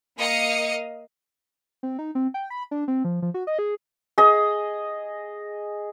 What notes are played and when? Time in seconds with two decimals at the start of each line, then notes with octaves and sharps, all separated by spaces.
0.17 A#3 D#5 F5 D#6 C#7
1.83 C4
1.99 D#4
2.15 C4
2.34 G5
2.50 B5
2.71 D4
2.88 C4
3.05 F3
3.22 F3
3.34 F#4
3.47 D#5
3.59 G#4
4.18 G#4 D#5